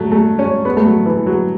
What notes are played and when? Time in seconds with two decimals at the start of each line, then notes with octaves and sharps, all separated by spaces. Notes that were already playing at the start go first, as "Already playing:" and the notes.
Already playing: F#3 A3
0.12 A3
0.39 C#4
0.65 B3
0.77 A3
0.85 F#3
1.06 E3
1.26 F#3